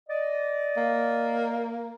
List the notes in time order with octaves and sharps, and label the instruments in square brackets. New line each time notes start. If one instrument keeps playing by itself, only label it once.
[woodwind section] D5 D#5
[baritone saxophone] A#3